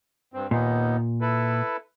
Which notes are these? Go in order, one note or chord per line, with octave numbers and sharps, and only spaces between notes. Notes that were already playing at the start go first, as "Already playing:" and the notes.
G2 C4
D#2 A#2 B3 D#4
E4 A4 B4